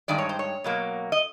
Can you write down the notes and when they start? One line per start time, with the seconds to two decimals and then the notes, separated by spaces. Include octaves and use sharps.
0.08 G2 D#3 G#3 D5
0.18 C#5
0.29 C5
0.39 C#5
0.64 B2 F#3 A#3
1.12 D#5